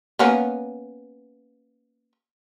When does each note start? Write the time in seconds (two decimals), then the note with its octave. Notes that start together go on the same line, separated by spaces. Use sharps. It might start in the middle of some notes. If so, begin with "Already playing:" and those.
0.19 A#3 B3 C#4